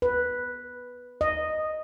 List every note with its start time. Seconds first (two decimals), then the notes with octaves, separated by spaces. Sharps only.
0.02 B4
1.21 D#5